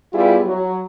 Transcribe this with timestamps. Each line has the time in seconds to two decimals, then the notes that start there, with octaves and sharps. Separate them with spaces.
0.13 G3 B3 E4 F4 G4 G#4
0.45 F#3